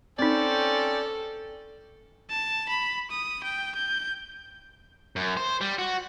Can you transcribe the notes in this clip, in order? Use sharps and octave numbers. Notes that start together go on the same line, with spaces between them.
C4 C#4 D#4 A4 C5 D5 G5
A5
B5
D#6
G5
G6
F#2
C5
G3
F#4